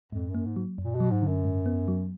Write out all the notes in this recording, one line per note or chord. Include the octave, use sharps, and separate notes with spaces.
F2 G#2
F#2
A#3
G#2
F#3
F#2
A#2
B2
F#3
G#2
D3
F#2
G#2
B3
F#3